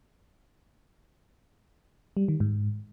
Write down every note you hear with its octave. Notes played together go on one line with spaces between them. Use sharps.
G3
D#3
G#2